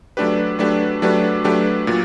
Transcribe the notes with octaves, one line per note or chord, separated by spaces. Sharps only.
F#3 A3 D4 G4 B4
F#3 A3 D4 G4 B4
F#3 A3 D4 G4 B4
F#3 A3 D4 G4 B4
A#2 F#3